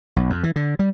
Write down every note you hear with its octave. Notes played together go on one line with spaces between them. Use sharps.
B1
F2
E3
D3
G3